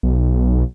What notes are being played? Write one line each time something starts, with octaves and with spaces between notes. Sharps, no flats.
B1